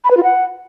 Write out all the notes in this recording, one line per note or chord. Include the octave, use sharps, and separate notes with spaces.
B5
B4
F4
F#5